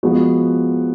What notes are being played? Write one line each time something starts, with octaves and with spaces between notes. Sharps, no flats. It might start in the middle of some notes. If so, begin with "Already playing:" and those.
F3 G#3 B3 F#4